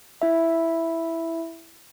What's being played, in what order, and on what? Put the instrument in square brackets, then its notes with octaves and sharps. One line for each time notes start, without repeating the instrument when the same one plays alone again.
[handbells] E4 E5